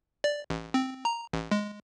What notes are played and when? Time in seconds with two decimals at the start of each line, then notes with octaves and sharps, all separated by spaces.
0.24 D5
0.50 A1
0.74 C4
1.05 A#5
1.33 A1
1.51 G#3